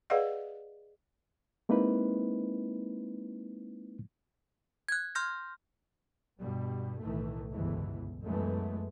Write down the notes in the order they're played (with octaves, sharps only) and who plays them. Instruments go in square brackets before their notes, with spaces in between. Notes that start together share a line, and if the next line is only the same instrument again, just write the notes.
[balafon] G#4 B4 D5 D#5 F5 F#5
[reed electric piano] G#3 A#3 C4 D#4 E4 B4
[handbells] F#6 G#6
C6 F6 G6 A#6
[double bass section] G2 B2 G3
B1 A2 D#3 E3 A3
G1 C#2 G#2 B2 E3
F#2 E3 G#3 A3 B3